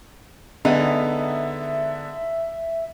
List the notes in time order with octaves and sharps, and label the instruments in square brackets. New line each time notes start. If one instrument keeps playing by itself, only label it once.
[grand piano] D3 B3 [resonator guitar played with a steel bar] G#3 D#4 [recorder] E5